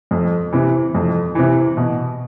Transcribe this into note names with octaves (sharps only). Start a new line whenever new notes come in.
F2
C3 E3
F2
C3 E3
B2